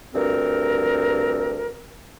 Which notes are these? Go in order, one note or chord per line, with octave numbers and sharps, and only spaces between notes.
D2 G2 C4 A#4